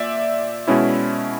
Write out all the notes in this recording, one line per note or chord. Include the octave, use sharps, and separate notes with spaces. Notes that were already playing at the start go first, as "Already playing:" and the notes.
Already playing: A#2 D5 E5
B2 G#3 C#4 E4